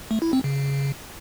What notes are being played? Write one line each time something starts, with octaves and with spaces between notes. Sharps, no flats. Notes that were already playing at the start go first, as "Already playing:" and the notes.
A3
E4
C4
C#3